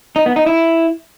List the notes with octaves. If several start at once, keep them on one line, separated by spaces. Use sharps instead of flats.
D#4
B3
D#4
E4